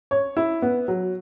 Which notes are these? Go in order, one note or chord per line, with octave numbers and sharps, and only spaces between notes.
C#5
E4
B3
F#3